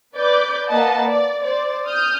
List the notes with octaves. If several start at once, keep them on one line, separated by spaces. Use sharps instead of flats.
B4 D5 D6 G6
A#3 B4 D#5 F#5 A5
D5
C5 D5
D#6 F6 G6